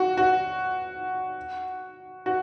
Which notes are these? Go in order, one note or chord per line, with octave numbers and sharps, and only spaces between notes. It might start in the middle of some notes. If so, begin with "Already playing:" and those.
Already playing: F#4
F#4
F#4